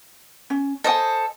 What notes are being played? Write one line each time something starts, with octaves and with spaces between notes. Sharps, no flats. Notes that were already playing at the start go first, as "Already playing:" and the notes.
C#4
A4 C5 D#5 G#5 D#6